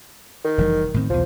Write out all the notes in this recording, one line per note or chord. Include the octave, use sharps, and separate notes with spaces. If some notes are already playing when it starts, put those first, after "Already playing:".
D#3
F1 E3 G3
A2 D#3 C4
B1 E2 F3